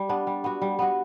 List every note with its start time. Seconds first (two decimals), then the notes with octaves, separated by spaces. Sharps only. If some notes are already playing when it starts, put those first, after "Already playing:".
Already playing: G3
0.09 B3 D4
0.27 G3
0.44 B3 F#4
0.62 G3
0.79 B3 F#4